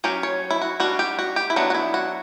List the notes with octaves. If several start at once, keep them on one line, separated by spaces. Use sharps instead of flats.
F#3 C#4 G4
C#5
E4
F#4
G3 D4 F#4
G4
F#4
G4
E4
F#3 B3 D4 F#4
F#4
E4
F#4